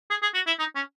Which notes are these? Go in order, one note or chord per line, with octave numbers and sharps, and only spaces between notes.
G#4
G#4
F#4
E4
D#4
C#4